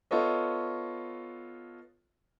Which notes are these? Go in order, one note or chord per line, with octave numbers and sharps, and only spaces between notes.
B3 F4 A4 C#5 D#5